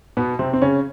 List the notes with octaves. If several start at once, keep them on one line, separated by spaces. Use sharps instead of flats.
B2 B3
C3 C4
C4
C#3 C#4